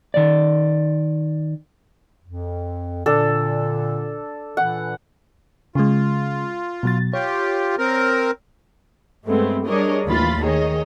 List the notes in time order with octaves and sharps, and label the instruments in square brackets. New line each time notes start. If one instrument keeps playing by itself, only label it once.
[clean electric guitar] D#3 D5
[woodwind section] F2
[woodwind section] A#2 D3 [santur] D4 A4
[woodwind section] A#2 E3 [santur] F#5
[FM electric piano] C#3 G#3 [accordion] F4
[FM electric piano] B2 F#3 A6
[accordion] F4 G4 [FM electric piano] C#5
[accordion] C4 A#4
[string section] G2 G#3 A3 B3 C4
G3 D4 G#4 A#4 C#5 D#5
D#2 A2 E3 F4 B5 A6
D#3 G#4 C#5 D#5